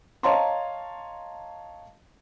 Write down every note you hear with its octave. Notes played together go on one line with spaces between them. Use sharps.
C#5 D#5 F5 A5 A#5 C6